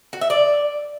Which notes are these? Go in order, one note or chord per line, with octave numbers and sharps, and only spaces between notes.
F#4
E5
D5